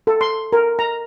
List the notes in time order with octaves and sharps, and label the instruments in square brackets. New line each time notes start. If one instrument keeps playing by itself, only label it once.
[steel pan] A4
C6
A#4
A#5